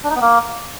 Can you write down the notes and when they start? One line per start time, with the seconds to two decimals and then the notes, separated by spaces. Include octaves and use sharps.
0.04 D4
0.10 D#4
0.15 B3
0.21 A#3